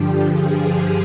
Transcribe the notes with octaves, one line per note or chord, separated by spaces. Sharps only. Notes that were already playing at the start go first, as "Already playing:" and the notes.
Already playing: G2 D3 F3 G4
G#4